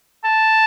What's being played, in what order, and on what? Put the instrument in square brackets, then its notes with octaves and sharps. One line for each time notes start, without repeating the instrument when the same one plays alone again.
[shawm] A5